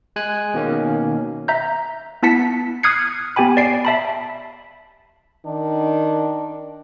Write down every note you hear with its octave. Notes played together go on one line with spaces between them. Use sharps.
G#3 G#5 F#6
B2 D#3 A#3 C#4
E5 A#5 G6
B3 E4 A5 B6 C#7
D#6 F6 F#6 G#6 C7 C#7
B3 G4 G5 G#5 B5
D5 C7 D7
E5 A5 B5
D#3 D4